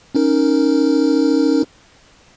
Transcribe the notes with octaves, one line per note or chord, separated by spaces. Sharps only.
C#4 D#4 A#4